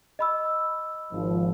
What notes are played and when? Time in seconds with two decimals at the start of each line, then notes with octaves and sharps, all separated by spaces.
0.19 D#5 B5 E6
1.12 G#1 F3